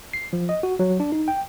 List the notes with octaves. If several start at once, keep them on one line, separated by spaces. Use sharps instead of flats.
C7
F3
D#5
F#4
F#3
D4
D#4
G5